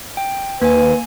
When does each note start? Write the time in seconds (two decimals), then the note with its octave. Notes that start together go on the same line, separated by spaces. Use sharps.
0.17 G5
0.61 D#2 A#3 B4 G#5